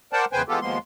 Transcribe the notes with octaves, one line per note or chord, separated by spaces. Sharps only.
A#4 C5 D5 F#5 G5 A5
E2 C#3 B4 C5 G5 G#5
E3 G#3 B3 F4 G4 A4
D#2 F3 G#3 A#3 B3 C6